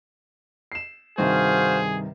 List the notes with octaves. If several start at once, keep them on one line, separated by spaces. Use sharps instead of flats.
C7 E7
G2 C3 D#3 F#4 G#4 C5 F5